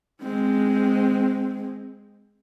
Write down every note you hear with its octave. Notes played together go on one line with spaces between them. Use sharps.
G#3 C4